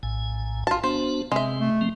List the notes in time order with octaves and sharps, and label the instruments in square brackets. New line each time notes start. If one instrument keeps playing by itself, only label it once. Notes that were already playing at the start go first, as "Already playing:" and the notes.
[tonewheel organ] A#1 A2 G#5
[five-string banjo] F4 A5 [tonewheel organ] F#4
[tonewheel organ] B3 D4 F#4 [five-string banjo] C5
[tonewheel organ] C3 C4 [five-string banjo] G#3 E5
[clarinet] A3
[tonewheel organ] F3 A#3 C4